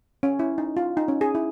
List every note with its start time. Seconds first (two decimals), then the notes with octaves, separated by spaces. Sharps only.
0.23 C#4
0.39 E4
0.58 D#4
0.77 F4
0.97 D#4
1.08 C#4
1.21 G#4
1.35 E4